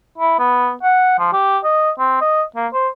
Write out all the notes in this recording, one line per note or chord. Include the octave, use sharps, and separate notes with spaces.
E4
B3
F#5
F3
G4
D#5
C4
D#5
A#3
C5